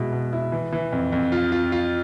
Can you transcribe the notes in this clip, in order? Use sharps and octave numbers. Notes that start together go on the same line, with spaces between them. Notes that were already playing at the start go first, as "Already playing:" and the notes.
Already playing: B2 G#3 E4
B2
E4
E3
E3
F2
F2
F4
F4
F4